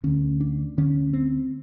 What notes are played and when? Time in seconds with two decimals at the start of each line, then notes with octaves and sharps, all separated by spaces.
0.03 D2 D3 C#4
0.40 D4
0.77 D2 D3 C#4
1.13 C4